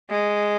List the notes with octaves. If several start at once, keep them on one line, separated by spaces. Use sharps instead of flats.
G#3